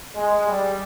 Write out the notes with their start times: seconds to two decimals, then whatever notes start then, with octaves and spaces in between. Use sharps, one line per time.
0.16 G#3
0.47 G3